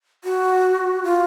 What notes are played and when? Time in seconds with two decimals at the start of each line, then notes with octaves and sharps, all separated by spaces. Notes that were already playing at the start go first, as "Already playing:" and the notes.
0.24 F#4
1.04 F4